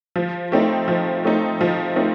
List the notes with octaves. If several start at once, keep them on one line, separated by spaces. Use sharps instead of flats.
F3
A3 C4 D#4
F3
A3 C4 D#4
F3
A3 C4 D#4